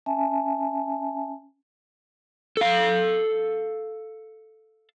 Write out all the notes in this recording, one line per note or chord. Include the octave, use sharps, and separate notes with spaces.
C#4 E5 G#5 A5
A4 F5